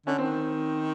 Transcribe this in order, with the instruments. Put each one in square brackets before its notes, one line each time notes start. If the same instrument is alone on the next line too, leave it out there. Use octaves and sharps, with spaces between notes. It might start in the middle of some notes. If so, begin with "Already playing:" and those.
[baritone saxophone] D3 [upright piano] C#4
[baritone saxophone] D#3 [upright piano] C4